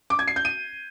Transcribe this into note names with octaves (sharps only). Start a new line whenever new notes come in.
D6
G#6
C7
G6
D#7